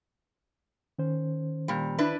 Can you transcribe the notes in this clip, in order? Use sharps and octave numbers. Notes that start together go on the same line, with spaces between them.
D#3 C#4 C5
A#2 G3
D4 E4 B4